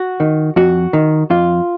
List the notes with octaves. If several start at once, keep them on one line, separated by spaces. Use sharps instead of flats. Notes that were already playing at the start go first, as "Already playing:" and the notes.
Already playing: F#4
D#3
F2 F#4
D#3
F2 F4